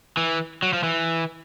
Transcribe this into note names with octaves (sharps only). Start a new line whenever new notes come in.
E3
F#3
F3
E3